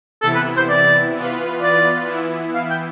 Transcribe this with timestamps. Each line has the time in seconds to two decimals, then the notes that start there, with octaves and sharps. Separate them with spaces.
0.22 C3 E3 B3 E4 A4
0.34 B4
0.57 C5
0.69 D5
1.15 E3 B3 F4 B4
1.61 D5
2.08 E3 B3 E4
2.54 F5
2.71 G5